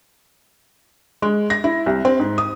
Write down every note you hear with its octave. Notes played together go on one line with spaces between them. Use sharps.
G#3
A#6
E4
C2
C4
G#2
D#6